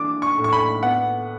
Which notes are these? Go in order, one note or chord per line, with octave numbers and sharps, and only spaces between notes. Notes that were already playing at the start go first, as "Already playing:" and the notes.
Already playing: E3 D4 D6
C#6
A2
C#6
B5
B3 F#5